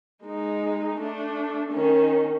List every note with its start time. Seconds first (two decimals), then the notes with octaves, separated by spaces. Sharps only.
0.24 G#3 D#4
0.97 A3 D4
1.71 D#3 C#4